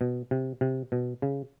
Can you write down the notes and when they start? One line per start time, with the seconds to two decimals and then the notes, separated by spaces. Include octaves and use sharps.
0.01 B2
0.31 C3
0.61 C3
0.92 B2
1.22 C#3